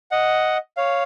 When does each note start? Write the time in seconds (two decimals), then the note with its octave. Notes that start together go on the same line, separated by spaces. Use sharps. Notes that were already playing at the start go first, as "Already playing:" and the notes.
0.11 D#5 F#5
0.77 C#5 F5